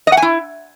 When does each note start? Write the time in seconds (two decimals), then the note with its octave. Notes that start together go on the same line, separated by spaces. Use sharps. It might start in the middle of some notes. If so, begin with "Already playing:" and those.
0.07 D#5
0.12 F#5
0.17 G#5
0.22 E4